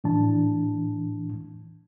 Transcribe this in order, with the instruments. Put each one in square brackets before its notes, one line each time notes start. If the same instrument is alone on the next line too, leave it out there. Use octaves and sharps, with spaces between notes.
[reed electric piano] A2 E3 D4 A5